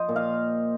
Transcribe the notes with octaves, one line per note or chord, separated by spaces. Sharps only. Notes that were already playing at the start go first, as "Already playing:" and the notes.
Already playing: F3 C5 D#5
A#2
F5